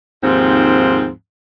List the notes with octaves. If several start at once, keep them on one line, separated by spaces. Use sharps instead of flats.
D#2 G#2 F3 C4